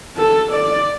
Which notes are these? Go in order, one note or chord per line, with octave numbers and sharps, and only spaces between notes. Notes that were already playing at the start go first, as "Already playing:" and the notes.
A4
D5